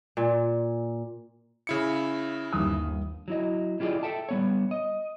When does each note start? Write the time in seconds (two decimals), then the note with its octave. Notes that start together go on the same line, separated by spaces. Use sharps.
0.17 A#2
1.67 C#3 E4 C#7
2.53 G1 D#2 D#6
3.28 F#3 E4 D#5
3.80 E4 F4 G4 G#4 D5 D#5
4.03 A4 E5 G5 A5
4.29 G3 B3 C#5
4.71 D#5